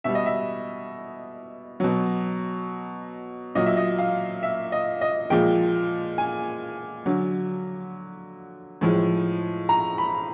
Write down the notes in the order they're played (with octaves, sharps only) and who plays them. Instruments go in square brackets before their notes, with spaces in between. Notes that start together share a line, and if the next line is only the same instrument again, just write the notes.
[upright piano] B2 G3 E5
D#5
E5
B2 F#3
A#2 F#3 D#5
E5
D#5
F5
E5
D#5
D#5
A#2 F3 G#3 G5
G#5
D3 F#3
A2 F3 G#3
A#5
B5